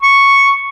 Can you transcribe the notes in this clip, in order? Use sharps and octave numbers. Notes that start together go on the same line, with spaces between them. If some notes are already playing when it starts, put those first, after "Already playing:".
C#6